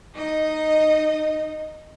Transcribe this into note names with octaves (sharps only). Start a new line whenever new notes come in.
D#4 D#5